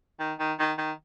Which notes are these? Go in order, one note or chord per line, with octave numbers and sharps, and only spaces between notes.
D#3
D#3
D#3
D#3